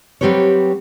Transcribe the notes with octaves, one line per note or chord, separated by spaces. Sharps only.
F#3 G3 C4 G4 B4 C#5